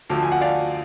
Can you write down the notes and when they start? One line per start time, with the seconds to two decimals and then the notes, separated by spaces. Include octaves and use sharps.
0.10 D2 D3 F3
0.23 G#5
0.32 F#5
0.41 D5 F5